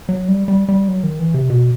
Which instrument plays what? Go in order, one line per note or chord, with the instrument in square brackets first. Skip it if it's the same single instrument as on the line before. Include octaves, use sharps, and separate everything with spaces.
[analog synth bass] F#3
G3
G3
G3
F#3
D#3
E3
C3
B2